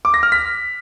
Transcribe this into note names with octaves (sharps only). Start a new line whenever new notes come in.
D6
A#6
F6
B6